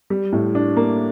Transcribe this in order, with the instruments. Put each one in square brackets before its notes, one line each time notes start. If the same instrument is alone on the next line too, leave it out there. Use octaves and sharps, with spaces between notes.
[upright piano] G3
A2
D4
A#3